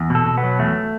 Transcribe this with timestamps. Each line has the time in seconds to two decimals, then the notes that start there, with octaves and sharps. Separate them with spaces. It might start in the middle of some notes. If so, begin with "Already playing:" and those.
Already playing: E2
0.10 B2 A4
0.26 B2
0.37 B3
0.43 F#3
0.59 E2 A3